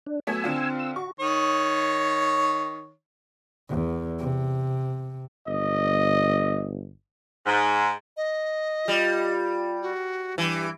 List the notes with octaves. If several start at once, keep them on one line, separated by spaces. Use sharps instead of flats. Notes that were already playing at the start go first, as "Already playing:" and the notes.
D4
F#3 A3 B3 G#5 E6
D3 C4 F4
E6
F#4 C#6
D#3 C#5
E2
C3
G1 D#5
G#2
D#5
G3 F4
F#4
G2 E3 G4